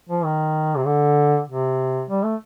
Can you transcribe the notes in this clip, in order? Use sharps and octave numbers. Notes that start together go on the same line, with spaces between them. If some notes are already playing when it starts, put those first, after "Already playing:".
F3
D#3
C3
D3
C3
G3
A3